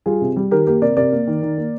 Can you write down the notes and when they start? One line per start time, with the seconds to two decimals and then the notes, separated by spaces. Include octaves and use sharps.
0.06 G3 F4 G#4
0.21 C3
0.36 G3
0.51 D#3 G4 A#4
0.66 A#3 G4 A#4
0.82 C3 A#4 D5
0.97 C3 A#4 D5
1.12 A#3
1.27 D#3
1.42 D#3
1.58 A#3